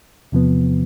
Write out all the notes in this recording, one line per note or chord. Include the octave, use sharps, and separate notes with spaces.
E2 C3 F3 B3